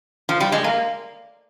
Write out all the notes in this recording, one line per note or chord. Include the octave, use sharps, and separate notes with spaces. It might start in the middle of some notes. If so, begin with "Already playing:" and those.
F3
G3
G#3
A#3